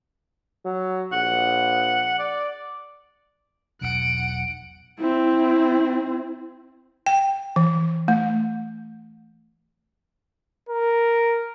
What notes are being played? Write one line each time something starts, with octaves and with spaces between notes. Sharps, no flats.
F#3
A#1 F#5
D5
E1 B1 F#5 D7
C4 E4
G5
E3
A3
A#4